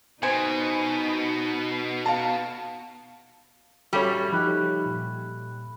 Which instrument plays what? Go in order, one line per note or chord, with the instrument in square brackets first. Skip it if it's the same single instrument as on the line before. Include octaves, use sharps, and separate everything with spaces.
[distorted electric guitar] B2 [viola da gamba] D#4 [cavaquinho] C5 G#5
[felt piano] F5 A5
[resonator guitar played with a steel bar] G3 A3 C#4 [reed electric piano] F#4 A4 C#5
[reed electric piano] F3 D#4 G4 [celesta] B5 F#6
[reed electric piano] A#2